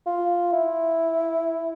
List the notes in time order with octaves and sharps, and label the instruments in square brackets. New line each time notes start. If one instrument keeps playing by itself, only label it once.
[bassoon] F4
E4